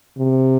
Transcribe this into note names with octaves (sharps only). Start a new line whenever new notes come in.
C3